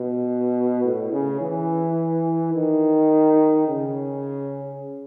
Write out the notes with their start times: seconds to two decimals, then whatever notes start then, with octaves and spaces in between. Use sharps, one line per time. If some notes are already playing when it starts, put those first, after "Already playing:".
Already playing: B2
0.84 A2
1.13 C#3
1.41 E3
2.54 D#3
3.68 C#3